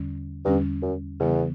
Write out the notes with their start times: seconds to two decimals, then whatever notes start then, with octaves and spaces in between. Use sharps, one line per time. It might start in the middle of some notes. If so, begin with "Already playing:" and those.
Already playing: E2 D3 G3 C#4
0.45 E2 G2 D3 G3 C#4
0.82 F#2
1.20 E2 C#3 E3 G3 B3